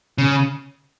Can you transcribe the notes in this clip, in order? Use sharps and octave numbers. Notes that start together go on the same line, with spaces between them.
C#3